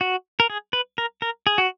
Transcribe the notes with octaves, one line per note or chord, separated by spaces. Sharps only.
F#4
A#4
G#4
B4
A#4
A#4
G#4
F#4